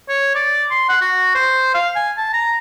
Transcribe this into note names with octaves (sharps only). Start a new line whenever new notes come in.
C#5
D5
C6
F#5
F#4
C5
F5
G#5
A5
A#5